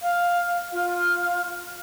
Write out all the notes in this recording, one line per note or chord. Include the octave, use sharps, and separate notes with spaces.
F5
F4